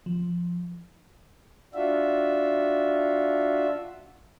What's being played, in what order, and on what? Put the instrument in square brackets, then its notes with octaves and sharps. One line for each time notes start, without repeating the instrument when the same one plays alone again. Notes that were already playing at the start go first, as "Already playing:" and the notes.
[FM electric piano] F3
[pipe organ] D4 F4 F#4 E5